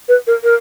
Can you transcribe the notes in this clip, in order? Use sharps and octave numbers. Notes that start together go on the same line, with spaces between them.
B4
A#4
A#4